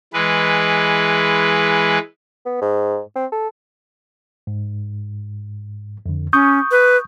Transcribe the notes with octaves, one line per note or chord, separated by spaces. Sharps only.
E3 G#3 B4
B3
G#2
C4
A4
G#2
F2 D3
C#4 C#6 D#6 G6
B4